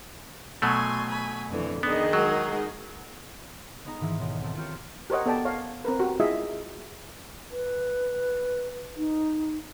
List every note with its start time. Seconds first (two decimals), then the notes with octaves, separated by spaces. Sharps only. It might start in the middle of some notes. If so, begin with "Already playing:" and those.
0.62 B2 F#3 A3 G#5 C6
1.09 G#5 B5
1.49 F2 D3 E3
1.83 D#3 B3 D4 D#4 G#4 D#5
2.13 F#3 G#3 F#4 A#4
3.84 G#3 B3 D#4 A#5
4.00 G#2 D#3 E3 E4
4.20 B1
4.43 C4 A4
4.57 C4 F4 G4 A#4 C#5
5.10 G4 A#4 C5 C#5 D#5 F#5
5.26 B3 A4 D5 G5 A5
5.45 C#5 F5
5.85 C4 A#4 B4
5.99 F#4 G4
6.20 G#3 E4 F4 G#4 D#5 E5
7.50 B4
8.97 D#4